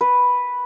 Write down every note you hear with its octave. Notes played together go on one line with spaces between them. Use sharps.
B4